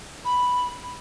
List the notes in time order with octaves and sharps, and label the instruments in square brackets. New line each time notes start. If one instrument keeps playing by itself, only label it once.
[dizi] B5